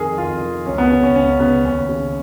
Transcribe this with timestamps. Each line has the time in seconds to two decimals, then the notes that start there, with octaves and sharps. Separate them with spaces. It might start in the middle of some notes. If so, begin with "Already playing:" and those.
Already playing: F2 D#3 G#4 A#4
0.18 F2 F4
0.41 D#3
0.66 C#2 C#4
0.78 B3
0.91 C#3 C#4
1.03 C#4
1.16 C#2 C#4
1.40 C#3 B3
1.64 D#2 C#4
1.89 C#3